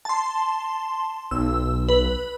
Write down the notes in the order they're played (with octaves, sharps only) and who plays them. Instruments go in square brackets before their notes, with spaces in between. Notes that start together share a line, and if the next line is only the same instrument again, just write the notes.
[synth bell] A5 C6
[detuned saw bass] B1 [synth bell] E6
[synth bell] B4